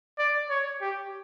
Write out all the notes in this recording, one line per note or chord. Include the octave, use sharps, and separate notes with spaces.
D5
C#5
G4